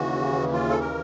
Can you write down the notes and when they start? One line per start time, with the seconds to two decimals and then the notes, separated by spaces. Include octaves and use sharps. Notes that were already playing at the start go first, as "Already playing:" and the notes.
Already playing: D#2 C#3 E3 F#4
0.53 F4
0.69 A4
0.80 A#4